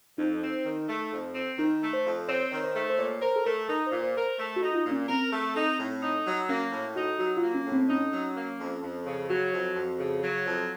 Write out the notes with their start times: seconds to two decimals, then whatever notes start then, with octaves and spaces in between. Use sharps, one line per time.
0.18 F2 D#4
0.42 C4
0.65 D#3
0.89 A3
1.12 F2
1.35 C4
1.58 D#3 D#4
1.82 A3
1.93 C5
2.06 F2
2.28 C4 C#5
2.40 C5
2.52 D#3 C#5
2.64 C5
2.76 A3
2.90 C5
2.98 A#2 C#5
3.21 A#4 C5
3.36 A4
3.45 A3 A#4
3.68 D#4 A#4
3.87 A#2 C5
4.03 C5
4.16 A#4
4.22 C5
4.39 A3
4.56 F#4
4.63 D#4
4.74 F4
4.86 A#2
4.91 C#4
5.08 C4 A#4
5.32 A3
5.56 D#4
5.80 A2
6.02 D#4
6.26 F#3
6.49 A#3 C#4
6.72 A2
6.96 D#4 F#4
7.19 F#3 F#4
7.37 F4
7.43 A#3
7.54 C#4
7.66 A2
7.72 C4
7.89 C#4 D#4
8.13 F#3
8.36 A#3
8.59 F2
8.82 F2
9.06 C#3
9.30 F#3 F#4
9.52 F2
9.76 F2
9.99 C#3
10.23 F#3
10.46 F2